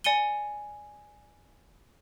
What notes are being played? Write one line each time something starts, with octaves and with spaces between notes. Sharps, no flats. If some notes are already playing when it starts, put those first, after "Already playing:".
D5 G#5 C#7 D#7 G7